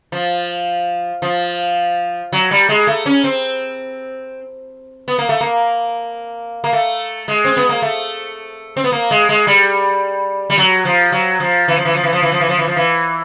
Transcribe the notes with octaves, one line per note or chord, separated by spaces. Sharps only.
F3
F3
F#3
G3
G#3
A3
C#4
C4
B3
A#3
A3
A#3
A#3
A3
G#3
C4
B3
A#3
A3
C4
B3
A#3
G#3
G#3
G3
G3
F#3
F3
F#3
F3
E3
F3
E3
F3
E3
F3
E3
F3
E3
F3
E3
F3
E3